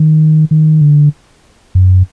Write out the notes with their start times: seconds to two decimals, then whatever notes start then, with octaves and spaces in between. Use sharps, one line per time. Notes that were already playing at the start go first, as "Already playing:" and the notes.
Already playing: D#3
0.51 D#3
0.81 D3
1.75 F#2